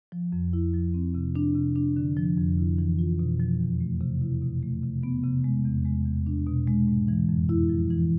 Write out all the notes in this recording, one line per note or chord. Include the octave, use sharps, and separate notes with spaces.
F3
F2
E4
F3
C4
C3
D4
C3
D4
D3
F3
F2
E4
E3
F4
B2
F3
E2
A3
C3
E4
B2
A3
C3
B3
C3
G#3
E2
G#3
E2
D4
B2
G#3
G#2
E3
F2
E4
F3
E3